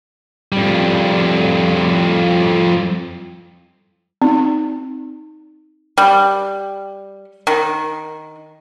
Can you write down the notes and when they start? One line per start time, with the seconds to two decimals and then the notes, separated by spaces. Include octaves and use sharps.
0.53 F2 G3
4.22 C4 D#4
5.98 G3
7.47 D#3